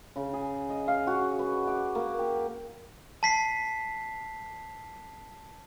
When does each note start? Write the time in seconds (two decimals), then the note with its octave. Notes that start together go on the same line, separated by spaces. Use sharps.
0.16 C#3
0.33 G#4
0.70 D#5
0.88 F5
1.07 F#4
1.39 B4
1.67 D6
1.95 A#3
2.19 G4
3.23 A5 B6 C7